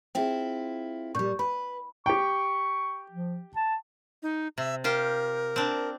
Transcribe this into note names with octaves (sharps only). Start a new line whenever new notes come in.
C4 E4 F4 G#4 E5 G5
A#2 G3 C#6 G6
B4 B5
G4 G5 C#6
F3
A5
D#4
C3 E5
F4 G4 A#4 C5
C4 D4